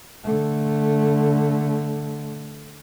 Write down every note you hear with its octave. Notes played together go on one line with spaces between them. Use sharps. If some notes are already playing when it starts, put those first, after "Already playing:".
D3 A3